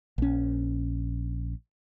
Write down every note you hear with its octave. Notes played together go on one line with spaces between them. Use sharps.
A#1 C#4